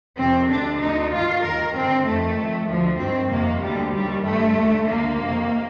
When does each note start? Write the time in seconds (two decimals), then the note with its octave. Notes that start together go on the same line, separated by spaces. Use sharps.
0.18 F2 C3 D#3 C4
0.49 D2 D3 D4
0.81 D2 D3 D#4
1.12 G2 D#3 F4
1.44 D#2 D#3 A#4
1.75 G2 D3 C4
2.06 F2 D#3 A3
2.37 F2 D#3
2.69 D2 D3 F3
3.00 G2 D#3 C4
3.31 F2 C3 D#3 A#3
3.63 D2 D3 G3
3.94 D#2 D#3 G3
4.25 G2 D3 A3
4.57 D#2 D3
4.88 D2 D3 A#3
5.19 F2 C3 D#3